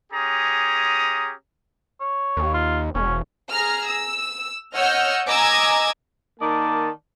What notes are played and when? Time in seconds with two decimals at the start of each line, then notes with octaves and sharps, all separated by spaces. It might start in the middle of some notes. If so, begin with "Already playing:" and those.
0.12 C#4 G4 G#4 A#5 D#6
2.00 C#5
2.37 D#2
2.54 F4
2.95 E1 C#4
3.51 G#4 A#5 F6
3.87 E6
4.74 C#5 D#5 F#5 E6 F6 G6
5.27 D#5 G#5 A#5 D6 E6 G#6
6.40 D#3 A#3 D5 D#5 A5